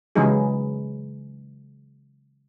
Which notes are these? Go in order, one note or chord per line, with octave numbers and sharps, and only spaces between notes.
C#3 E3 F#3 G#3 D#4 G#4